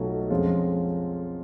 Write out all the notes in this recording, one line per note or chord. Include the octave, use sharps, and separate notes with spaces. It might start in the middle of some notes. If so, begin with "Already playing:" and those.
Already playing: B1 B2 F#3 A3 F4
F2 F3 G#3 C#4 F4